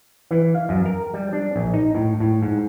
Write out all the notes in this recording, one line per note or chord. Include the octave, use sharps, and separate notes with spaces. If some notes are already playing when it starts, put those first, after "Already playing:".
E3
F5
F#2
A#4
G3
D4
A#1
D#4
A2
A2
G#2